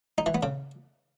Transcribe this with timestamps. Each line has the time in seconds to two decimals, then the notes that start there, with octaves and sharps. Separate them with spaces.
0.18 D#4
0.26 E3
0.34 B3
0.43 C#3